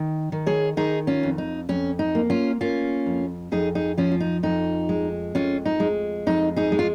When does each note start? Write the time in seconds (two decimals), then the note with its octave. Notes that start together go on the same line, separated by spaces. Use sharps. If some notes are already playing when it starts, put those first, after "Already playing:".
Already playing: D#3
0.32 D#3
0.46 G#4 C#5
0.77 D#3 D#4 G#4
1.07 C#4 F4
1.23 F2
1.38 D#4
1.69 F2 C#4
1.99 D#4
2.15 A#3
2.30 C#4 F4
2.61 A#3 C#4 F4
3.06 F2
3.52 F2 D#4 G#4
3.75 D#4 G#4
3.97 F3 C#4 F4
4.11 F4
4.20 D#4
4.43 F2 D#4
4.89 G#3
5.35 F2 C#4 F4
5.65 D#4
5.80 G#3
6.27 F2 D#4
6.56 D#4 G#4
6.72 G#3
6.79 F4